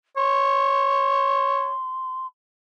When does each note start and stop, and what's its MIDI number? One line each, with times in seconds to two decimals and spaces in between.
0.17 1.72 73
0.17 2.27 84